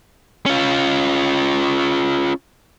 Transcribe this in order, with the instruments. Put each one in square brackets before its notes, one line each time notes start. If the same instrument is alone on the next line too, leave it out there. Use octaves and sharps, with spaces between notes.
[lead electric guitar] C#4 F4